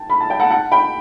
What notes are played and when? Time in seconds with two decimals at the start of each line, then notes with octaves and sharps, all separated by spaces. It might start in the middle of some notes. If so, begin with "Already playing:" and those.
Already playing: G5 A5
0.10 B5
0.20 A5
0.30 G5
0.40 F#5 A5
0.51 F#5 A5
0.71 G5 B5